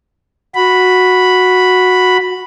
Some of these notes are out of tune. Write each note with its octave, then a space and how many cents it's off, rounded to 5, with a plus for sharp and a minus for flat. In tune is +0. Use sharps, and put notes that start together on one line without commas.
F#4 -10 B5 +0